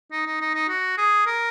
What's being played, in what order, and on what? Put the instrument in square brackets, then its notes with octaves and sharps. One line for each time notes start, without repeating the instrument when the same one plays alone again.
[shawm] D#4
D#4
D#4
D#4
F#4
G#4
A#4